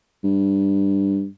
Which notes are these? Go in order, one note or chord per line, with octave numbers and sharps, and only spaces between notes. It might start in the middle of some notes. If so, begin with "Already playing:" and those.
G2